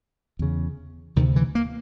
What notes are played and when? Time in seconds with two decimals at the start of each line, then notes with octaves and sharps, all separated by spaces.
0.39 E2 C#3
1.16 D2 C3 D#3
1.36 E3
1.55 A#3